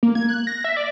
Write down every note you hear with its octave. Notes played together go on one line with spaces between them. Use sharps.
A#3
G#6
F#6
A#6
E5
D5